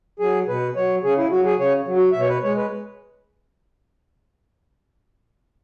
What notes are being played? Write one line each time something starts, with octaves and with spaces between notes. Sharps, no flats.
F#3 G#4
B2 B4
F#3 C#5
C#3 G#4
E4
F#3 F#4
G#4
C#3 C#5
F#3
F#4
B2 E5
C#5
B4
G#3 C#5
B4